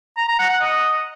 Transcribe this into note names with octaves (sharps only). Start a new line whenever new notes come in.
A#5
A#5
F#5
F#5
D#5